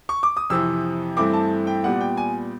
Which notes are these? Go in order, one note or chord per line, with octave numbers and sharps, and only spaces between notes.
C#6
D6
D#6
F2 C3 E3 E6
G2 E3 A3 C4 E4 D6
A5
G5
A#2 G3 B3 F#5
G5
G#5